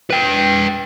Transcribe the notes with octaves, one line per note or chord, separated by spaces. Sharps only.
B4 G5